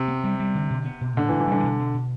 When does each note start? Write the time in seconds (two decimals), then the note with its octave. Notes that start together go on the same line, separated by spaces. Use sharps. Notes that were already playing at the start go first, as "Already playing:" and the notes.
Already playing: C3
0.08 B3
0.24 G3
0.39 G3
0.55 D3
0.70 B2
0.85 B3
1.01 B2
1.17 A2 D3
1.29 E3
1.32 A2
1.40 E3
1.48 D3 G3
1.63 B2
1.79 B2
1.94 B2